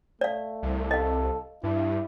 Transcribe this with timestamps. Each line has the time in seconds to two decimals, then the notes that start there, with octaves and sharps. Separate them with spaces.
0.21 A3 D5 F5
0.63 C2
0.91 A4 D#5 F5
1.63 G2 E4